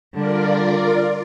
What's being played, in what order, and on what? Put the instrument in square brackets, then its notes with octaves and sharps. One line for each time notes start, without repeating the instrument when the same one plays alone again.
[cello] D3 G3 [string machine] F4 A#4 D5